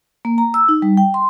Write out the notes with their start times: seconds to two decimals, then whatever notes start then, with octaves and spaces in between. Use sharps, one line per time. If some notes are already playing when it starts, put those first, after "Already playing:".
0.25 A#3
0.38 A#5
0.54 E6
0.69 D#4
0.82 G3
0.97 G5
1.14 C6